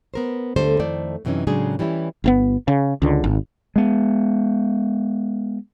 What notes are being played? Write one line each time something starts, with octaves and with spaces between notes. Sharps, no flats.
B3 A#4 C5
D2 D3 G3 A3 A4 C5
F2 D#3 A3 E4 C5 D5
F#2 C3 E3 G3 C#4 D#4
A2 C#3 F#3 G#3 D4 G#4
E3 G3 C#4 E4
G1 C3 B3
C#3
C#2 D3
G#1
G#3 B3